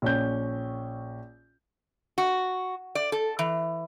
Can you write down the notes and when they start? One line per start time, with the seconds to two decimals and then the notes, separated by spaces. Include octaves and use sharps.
0.02 A#1 C#4 G6
2.18 F#4
2.95 D5
3.12 A4
3.39 E3